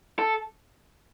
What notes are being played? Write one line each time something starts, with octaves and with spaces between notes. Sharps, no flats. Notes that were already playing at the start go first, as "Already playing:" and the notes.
A4